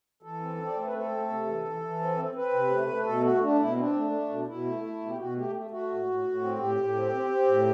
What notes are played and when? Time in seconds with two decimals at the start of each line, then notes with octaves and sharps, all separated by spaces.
0.22 E3 A4
0.40 C4
0.58 C4
0.66 D5
0.75 A3 C5
0.85 B4
0.93 C4 A4
1.11 A3
1.29 C3
1.46 E3
1.65 E3
1.82 E3
2.00 C4
2.17 C4
2.35 C4 B4
2.53 C3
2.70 A3
2.88 A3
3.06 B2 A4
3.23 A3 F#4
3.41 A3 D4
3.58 B2 E4
3.76 C4 D4
3.94 A3
4.12 A3
4.29 B2
4.47 B2 E4
4.65 A3
4.83 A3
5.01 B2
5.08 G4
5.18 B2 F#4
5.35 A3 G4
5.53 A3
5.71 A3 F#4
5.89 A2
6.06 A2
6.24 A2
6.42 C4
6.59 A2 G4
6.77 A2
6.95 C4
7.12 C4
7.30 C4
7.48 A2